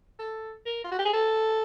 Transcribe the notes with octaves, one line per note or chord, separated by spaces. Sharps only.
A4
A#4
F4
F#4
G4
G#4
A4